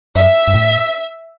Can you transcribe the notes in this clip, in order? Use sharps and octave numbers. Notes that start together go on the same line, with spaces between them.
F#2 E5
G2
A2